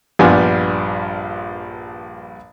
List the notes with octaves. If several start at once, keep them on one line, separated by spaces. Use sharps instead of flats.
A#1 G2 G3 B3 F4 G#5